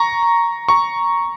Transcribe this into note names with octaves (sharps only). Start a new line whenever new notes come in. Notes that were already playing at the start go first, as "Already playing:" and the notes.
Already playing: A#5 C#6
A#5 C#6